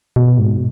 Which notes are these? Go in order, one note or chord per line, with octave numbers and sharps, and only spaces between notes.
B2
G#2